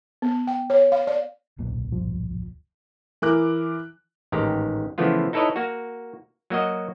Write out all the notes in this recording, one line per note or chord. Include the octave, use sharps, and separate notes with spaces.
B3
G5
C#5
F5
D5
D1 B1 A#2
G2 F3
E3 E4 A#4 D6 F#6
A1 G#2 D#3 G4 A#5
C#3 E3 F3 A3 B3 F4
D#4 E4 A4 B4 C#5 D#5
A#3 F#4
F#3 A#3 F#4 D#5